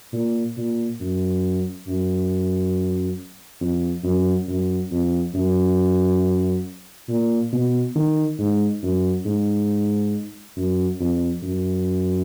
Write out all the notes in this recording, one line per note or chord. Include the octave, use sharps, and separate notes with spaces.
A#2
A#2
F#2
F#2
F2
F#2
F#2
F2
F#2
A#2
B2
D#3
G#2
F#2
G#2
F#2
F2
F#2